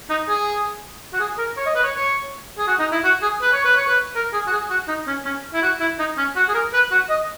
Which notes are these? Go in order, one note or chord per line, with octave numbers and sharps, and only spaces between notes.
D#4
G#4
F#4
G#4
A#4
C#5
D#5
B4
C#5
C#5
G#4
F#4
D#4
E4
F#4
G#4
B4
C#5
B4
C#5
B4
A#4
G#4
F#4
G#4
F#4
D#4
C#4
C#4
E4
F#4
E4
D#4
C#4
F#4
G#4
A#4
B4
F#4
D#5